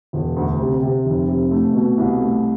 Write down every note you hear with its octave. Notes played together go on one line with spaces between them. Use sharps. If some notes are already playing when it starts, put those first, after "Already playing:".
E1
D2
C3
C3
F1
C3
A3
B2
C2
A3